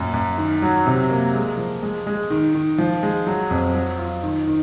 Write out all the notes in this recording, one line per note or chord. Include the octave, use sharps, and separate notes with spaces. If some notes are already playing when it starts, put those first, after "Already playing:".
Already playing: F#2 A#2
F#2
D#3
F#3
C3
A#3
G#3
F3
G#3
G#3
D#3
D#3
F3
G#3
F#3
F2
F#3
F4
D#3
D#3